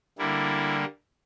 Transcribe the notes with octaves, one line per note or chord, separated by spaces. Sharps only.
D3 G3 A#3 E4